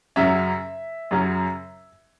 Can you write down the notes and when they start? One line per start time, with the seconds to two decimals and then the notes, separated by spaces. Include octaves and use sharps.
0.16 F#2 C#3 F#3 C#4 E5
1.11 F#2 C#3 F#3 C#4